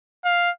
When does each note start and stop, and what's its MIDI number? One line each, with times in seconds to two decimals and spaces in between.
0.25 0.50 77